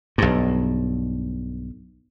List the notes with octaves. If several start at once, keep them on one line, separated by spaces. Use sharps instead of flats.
B1 G2